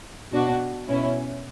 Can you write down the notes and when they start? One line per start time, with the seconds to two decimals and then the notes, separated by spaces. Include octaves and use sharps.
0.33 B2 D4 F#4
0.88 B2 C#4 E4